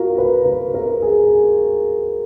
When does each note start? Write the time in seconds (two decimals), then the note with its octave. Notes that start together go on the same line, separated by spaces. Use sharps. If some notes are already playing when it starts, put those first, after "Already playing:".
Already playing: F4 F#4 A#4
0.18 B4
0.45 B4
0.74 A#4
1.02 G#4